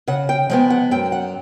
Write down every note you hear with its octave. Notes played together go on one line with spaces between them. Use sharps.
C#3 F#5
G5
F3 G#3 B3 G5
F#5
F#2 G5
F#5